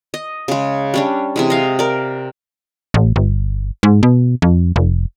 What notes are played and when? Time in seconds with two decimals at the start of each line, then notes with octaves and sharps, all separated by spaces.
0.14 D#5
0.48 C#3 G#3
0.94 G3 C#4 D4
1.36 C3 E3 G#3
1.50 D#5 F5
1.79 A#4 D5
2.94 A1
3.16 G1
3.83 G#2
4.03 B2
4.42 F2
4.76 F1